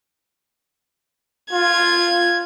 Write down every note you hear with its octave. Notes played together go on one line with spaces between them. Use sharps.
F4 G#6